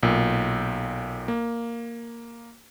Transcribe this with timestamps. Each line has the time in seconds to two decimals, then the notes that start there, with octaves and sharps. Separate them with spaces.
0.03 B1 A#2
1.28 A#3